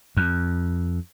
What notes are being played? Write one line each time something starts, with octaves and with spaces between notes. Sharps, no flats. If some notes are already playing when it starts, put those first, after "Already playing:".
F2